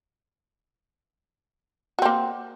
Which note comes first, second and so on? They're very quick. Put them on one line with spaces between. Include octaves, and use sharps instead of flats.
F#4 C4 A#3